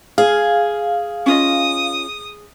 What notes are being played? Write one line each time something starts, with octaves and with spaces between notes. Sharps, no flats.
G#4 F5
C#4 F4 D#5 D#6